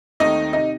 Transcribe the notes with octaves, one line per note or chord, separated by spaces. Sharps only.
D#2 D#3 A3 C4 D#4 D#5
C3 D#4 D#5